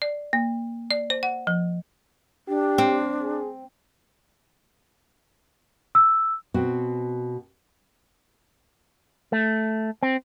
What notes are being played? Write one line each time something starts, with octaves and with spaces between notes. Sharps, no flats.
D5
A#3
D5
C5
F#5
F3
D4 G4
C4
G#4
E6
B2 C4 F#4
A3
C4